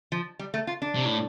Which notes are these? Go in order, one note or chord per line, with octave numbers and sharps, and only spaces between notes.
F3
G3
A3
F4
D4
C3
A2